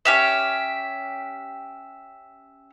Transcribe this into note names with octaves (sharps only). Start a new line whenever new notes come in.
C#4 G4 E5